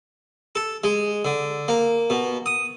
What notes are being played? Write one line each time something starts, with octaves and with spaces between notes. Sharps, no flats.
A4
G#3
D3
A#3
B2
D#6